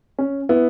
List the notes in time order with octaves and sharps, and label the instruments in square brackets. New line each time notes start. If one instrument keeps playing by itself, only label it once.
[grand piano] C#4
B3 E4